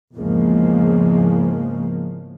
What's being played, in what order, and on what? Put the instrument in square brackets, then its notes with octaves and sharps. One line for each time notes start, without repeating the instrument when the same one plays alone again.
[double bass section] E2 G#2 C#3 F3 G#3 A#3